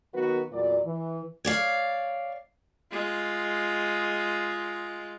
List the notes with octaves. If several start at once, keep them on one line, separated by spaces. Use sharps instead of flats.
D#3 F#3 A#3 B3 F#4 B4
E2 A#2 F#3 D5
E3
C#5 D5 F5
G#3 F4